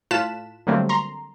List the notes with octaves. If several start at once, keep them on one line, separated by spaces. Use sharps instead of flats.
A2 F4 A5 F#6 B6 E7
D3 F#3 G3 A3 A#3 C4
A#5 C6